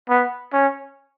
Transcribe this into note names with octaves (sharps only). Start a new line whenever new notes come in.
B3
C#4